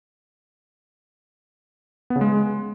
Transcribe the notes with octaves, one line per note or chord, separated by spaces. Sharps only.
B3
C#3
G#3